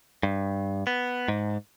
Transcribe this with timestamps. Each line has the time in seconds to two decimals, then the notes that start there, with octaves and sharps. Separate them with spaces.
0.23 G2
0.87 B3
1.28 G#2